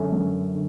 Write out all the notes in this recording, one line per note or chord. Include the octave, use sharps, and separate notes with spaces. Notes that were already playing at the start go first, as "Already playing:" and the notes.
Already playing: F#2 D3 A3 C#4
F#2
D3